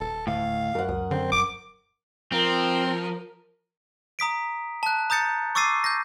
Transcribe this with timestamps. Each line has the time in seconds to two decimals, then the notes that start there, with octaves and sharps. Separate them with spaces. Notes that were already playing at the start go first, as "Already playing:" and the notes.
0.01 D#1 A4
0.27 D2 A2 F5
0.75 F#2 A#4 F#5
0.89 C#2 D#6
1.11 D3 C4
1.32 D#1 D6
2.32 F3 C4 A#4
4.19 A#5 D#6 B6 D7
4.83 A5 F#6
5.10 A#5 D#6 G6 A6 C#7
5.55 C#6 D6 E6 A6 C7 D#7
5.84 G6 A#6